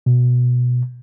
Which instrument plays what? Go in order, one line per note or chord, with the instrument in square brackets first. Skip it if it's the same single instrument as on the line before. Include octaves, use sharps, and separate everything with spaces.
[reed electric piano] B2